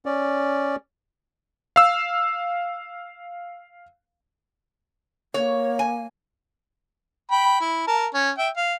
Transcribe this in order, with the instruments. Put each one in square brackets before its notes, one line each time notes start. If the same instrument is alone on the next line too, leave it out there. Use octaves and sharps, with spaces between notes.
[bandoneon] C#4 D5
[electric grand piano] F5 E6
[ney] A#3 [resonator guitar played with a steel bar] C#5
[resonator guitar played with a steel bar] G#5
[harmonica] G5 B5
E4
A#4 A5
C#4
E5 G5
F5